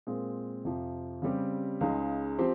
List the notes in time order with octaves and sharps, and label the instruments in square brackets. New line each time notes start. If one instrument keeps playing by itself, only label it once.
[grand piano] A#2 G#3 C4
F2 C3 F3
C#3 G3 C4 G4
C#2 C#3 G#3 D#4 G#4
F3 C4 G4 C5